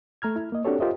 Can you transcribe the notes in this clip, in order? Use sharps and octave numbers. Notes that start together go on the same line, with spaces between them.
A3 A#5 F6 G#6
E4
A#3 D#5
C4 D4 F#4 G4 A4 C#5
F4 G4 A#4 C5 D#5 E5